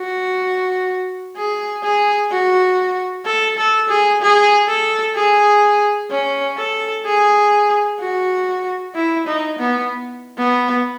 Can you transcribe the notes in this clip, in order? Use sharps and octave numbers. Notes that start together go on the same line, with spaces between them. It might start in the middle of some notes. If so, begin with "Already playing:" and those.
Already playing: F#4
G#4
G#4
F#4
A4
A4
G#4
G#4
A4
G#4
C#4
A4
G#4
F#4
E4
D#4
B3
B3